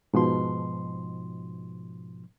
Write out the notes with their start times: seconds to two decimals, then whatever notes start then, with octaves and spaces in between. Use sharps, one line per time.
0.14 G#2 B2 F3 C6